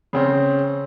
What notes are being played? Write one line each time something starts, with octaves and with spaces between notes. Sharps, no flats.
C#3 C4 C#4